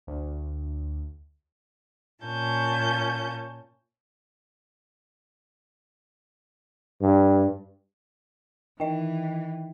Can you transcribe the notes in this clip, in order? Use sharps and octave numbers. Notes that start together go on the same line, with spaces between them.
D2
A#2 C#4 A5 G6
G2
D#3 E3 D#5 G5